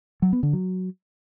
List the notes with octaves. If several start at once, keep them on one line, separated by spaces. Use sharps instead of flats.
F#3
B3
D3
F#3